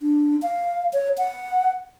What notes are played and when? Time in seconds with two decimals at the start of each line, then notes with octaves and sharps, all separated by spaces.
0.02 D4
0.42 F5
0.93 C#5
1.18 F#5